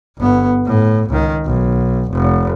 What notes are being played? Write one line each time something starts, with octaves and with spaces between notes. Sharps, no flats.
G1 B3
A2
C#2 D#3
B1
F1